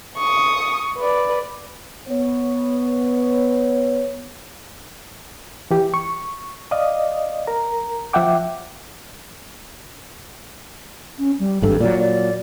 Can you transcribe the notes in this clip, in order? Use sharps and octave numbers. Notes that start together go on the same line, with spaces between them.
C#6 D#6
B4 D5
B3 C#5
E3 G4
C#6
D5 D#5 F5 D#6
A#4 A#5
F3 E5 F#5 G5 D6
C#4
G3
G#1 G2 A4
A#2 F#3 D5
D5